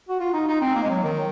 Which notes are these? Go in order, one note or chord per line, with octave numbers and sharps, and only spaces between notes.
F#4
F4
D#4
D#4
C4
A#3
G#3
F#3
D#3